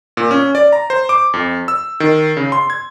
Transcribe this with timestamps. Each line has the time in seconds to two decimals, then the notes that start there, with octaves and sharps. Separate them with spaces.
0.17 A#2
0.31 C#4
0.55 D5
0.73 A#5
0.90 C5
1.09 D6
1.34 F2
1.68 E6
2.00 D#3
2.37 C#3
2.52 C6
2.70 G#6